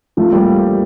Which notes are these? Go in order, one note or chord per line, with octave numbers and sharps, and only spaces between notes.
F3 A3
G3 A#3